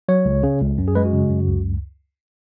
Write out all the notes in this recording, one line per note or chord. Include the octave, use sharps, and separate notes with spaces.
F#3 C#5
C#2
C#3
C#2
F#2
G#4
G#3 B4
F#4
C#3
F#2
C#2